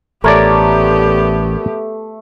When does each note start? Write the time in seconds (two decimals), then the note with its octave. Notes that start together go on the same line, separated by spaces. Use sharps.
0.24 A1 A3 B3 G4 A#4 C#5 D5